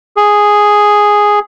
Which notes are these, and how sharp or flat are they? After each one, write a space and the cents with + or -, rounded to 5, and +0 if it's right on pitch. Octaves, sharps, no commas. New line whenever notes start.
G#4 +0